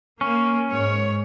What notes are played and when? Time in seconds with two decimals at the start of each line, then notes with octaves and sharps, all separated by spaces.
0.21 A#3 C#4
0.71 G#2 C#5